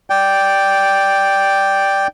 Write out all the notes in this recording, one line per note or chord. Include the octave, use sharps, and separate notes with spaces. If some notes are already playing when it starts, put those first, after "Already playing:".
D5 G5